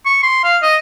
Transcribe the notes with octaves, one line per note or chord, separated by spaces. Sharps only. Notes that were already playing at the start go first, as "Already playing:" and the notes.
C#6
C6
F5
D#5